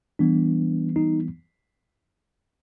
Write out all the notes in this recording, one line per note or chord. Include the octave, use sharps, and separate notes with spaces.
E3 G3 B3 D4
D#4